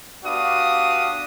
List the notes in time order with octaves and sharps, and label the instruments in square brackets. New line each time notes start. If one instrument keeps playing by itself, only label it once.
[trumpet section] B3 D4 F#4 G4 F5 D#6